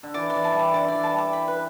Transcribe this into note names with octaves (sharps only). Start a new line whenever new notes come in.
D3
E3 D5
E3 D5
A5
G3 D6
D3 D5
E3 D5
A5
G3
D6
B5
B4